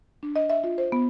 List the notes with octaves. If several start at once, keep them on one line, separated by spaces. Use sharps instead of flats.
D4
D#5
E5
F4
C5
B3